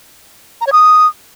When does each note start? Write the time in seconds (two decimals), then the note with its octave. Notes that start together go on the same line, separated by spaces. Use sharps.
0.61 A#5
0.67 C#5
0.73 D#6